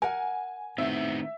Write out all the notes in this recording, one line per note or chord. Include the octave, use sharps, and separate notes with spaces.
A#4 F#5 G#5
A2 D#3 B3 C4 E5